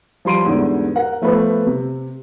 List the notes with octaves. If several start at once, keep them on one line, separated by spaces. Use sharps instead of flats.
F3 G3 C6 D7 D#7
E2 G#2 D3 G3
A#4 F#5
F3 A3 B3 B4 C5
C3